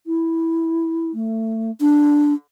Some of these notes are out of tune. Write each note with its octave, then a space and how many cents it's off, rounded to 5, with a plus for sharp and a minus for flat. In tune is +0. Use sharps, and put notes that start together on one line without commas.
E4 -5
A3 +25
D4 +0